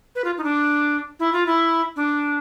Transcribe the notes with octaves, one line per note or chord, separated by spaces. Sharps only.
B4
F4
D#4
D4
E4
F4
E4
D4